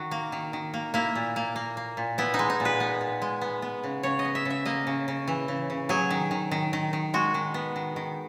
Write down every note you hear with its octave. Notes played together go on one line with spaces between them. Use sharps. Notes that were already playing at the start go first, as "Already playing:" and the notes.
Already playing: D#3 F#4
A#3
D#3
D#3
A#3
A#3 E4
A#2
A#3
A#3
A#3
A#2
B3 E4
D#4
G#3
D#4
A#2
B4
B3
A#2
G#3
B3
B3
C#3
C#3 C#5
D#5
B3
E5
C#3
E5
A#3 D#5
C#3
C#3
E3
C#3
C#3
F#3 G#4
D#3
D#3
D#3
D#3
D#3
G#3 F#4
D#3
B3
D#3
D#3